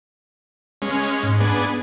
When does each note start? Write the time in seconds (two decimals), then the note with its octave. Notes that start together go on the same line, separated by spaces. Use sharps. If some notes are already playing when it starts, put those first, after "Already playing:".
0.82 G#3 C#4
1.23 G#2
1.40 B3 D4 G#4